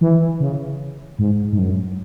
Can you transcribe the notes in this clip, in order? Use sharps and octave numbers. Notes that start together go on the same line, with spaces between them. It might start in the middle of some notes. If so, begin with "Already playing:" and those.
E3
C#3
G#2
G#2
F#2